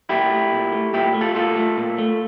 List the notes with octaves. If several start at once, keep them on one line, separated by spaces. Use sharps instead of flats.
A#2 E4 G4
A3
A#2
A3
A#2 E4 G4
A3
F4 A4
A#2 F4 A4
A3
A#2
A3